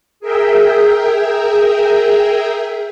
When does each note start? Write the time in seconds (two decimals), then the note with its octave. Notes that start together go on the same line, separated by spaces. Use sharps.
0.20 G#4 A#4 E5 G5